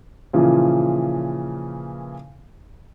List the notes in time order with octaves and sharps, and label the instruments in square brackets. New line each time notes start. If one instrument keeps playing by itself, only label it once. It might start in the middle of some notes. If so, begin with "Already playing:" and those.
[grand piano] A#2 C#3 E3 F3